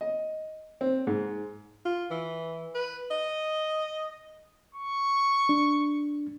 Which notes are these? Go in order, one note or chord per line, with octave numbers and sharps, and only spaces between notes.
D#5
C4
G#2
F4
E3
B4
D#5
C#6
D4